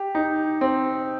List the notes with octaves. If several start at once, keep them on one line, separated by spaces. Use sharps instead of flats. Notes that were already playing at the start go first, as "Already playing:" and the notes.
Already playing: G4
D#4
C4